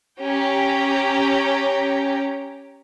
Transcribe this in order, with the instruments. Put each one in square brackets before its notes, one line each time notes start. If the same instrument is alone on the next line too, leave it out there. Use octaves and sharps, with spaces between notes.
[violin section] C#4 G4 C#5 G5 A#5